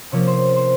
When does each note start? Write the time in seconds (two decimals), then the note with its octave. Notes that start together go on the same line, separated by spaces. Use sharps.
0.12 C3 F3 A#3 C#4 C#5
0.27 C5
0.56 C5